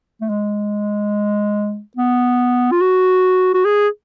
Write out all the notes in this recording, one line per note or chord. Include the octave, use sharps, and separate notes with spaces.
A3
G#3
B3
F4
F#4
F#4
G#4